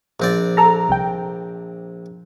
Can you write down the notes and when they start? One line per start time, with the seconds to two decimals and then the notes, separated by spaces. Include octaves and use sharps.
0.20 A#1 C4 D5
0.57 A4 A#5
0.89 C2 G5